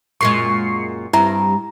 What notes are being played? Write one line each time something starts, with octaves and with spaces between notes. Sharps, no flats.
F#2 A#2 G#3 C#6 C7 C#7
G2 C4 E4 A#5